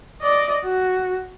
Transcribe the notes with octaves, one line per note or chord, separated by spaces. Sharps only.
D5 D#5
F#4